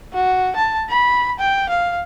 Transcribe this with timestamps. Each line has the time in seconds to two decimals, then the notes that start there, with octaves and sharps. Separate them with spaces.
0.13 F#4
0.56 A5
0.90 B5
1.39 G5
1.69 F5